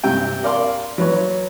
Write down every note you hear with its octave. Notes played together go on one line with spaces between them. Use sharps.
G2 C3 G5
A#4 D5 F5 C6
F#3 B4 C#5